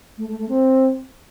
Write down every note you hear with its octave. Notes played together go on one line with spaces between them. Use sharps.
A3
A3
A3
C4